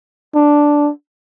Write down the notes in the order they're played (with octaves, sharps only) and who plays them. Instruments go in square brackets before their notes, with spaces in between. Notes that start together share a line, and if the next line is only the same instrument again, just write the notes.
[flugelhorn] D4